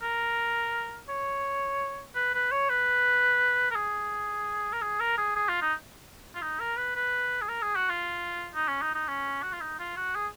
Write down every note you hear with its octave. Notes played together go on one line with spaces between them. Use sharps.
A#4
C#5
B4
B4
C#5
B4
A#4
G#4
A#4
G#4
A#4
G#4
G#4
F4
D#4
F4
D#4
A#4
B4
B4
G#4
A#4
G#4
F#4
F4
D#4
C#4
D#4
D#4
C#4
F#4
F4
D#4
F4
F#4
G#4